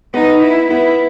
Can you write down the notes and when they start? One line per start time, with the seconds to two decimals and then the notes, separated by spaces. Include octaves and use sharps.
0.14 B3 D#4
0.43 E4
0.70 B3 E4